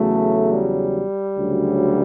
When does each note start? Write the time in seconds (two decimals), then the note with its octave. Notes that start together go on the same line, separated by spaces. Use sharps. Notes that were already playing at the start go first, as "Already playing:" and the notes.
Already playing: E2 C#3 F#3 A3
0.53 G3
1.37 D2 C#3 F#3